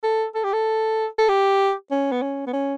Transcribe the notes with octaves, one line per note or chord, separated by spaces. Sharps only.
A4
A4
G4
A4
A4
G4
C#4
B3
C#4
B3
C#4